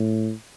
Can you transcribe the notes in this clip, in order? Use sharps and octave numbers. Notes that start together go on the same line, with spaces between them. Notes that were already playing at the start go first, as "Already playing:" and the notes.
Already playing: A2